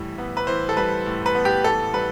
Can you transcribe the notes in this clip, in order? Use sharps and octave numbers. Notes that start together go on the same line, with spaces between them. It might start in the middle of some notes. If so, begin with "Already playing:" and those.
Already playing: A2 E3 G3
B3
B4
E3 C5
A4
G3 B4
A2
B4
B3
G4
E3 A4
G3 B4